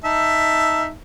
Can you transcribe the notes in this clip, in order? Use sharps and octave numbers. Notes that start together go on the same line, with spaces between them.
D#4 E5 A5